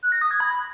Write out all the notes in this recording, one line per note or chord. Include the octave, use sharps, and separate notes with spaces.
F#6
A#6
D#6
G#6
B5